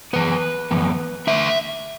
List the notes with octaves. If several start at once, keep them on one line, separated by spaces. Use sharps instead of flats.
F#2 E3 B3 B4
F#2 E3 B3
E2 D3 A3 D4 E5